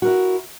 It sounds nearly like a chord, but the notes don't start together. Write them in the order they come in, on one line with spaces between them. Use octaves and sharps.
F#4 A#4 E4